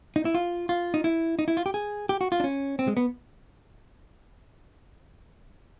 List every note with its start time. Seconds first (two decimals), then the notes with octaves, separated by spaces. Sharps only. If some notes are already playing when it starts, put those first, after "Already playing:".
0.16 D#4
0.25 E4
0.35 F4
0.69 F4
0.94 D#4
1.04 E4
1.39 D#4
1.48 E4
1.57 F4
1.66 G4
1.74 G#4
2.09 G4
2.21 F#4
2.32 F4
2.40 D4
2.44 C#4
2.79 C4
2.88 G#3
2.97 B3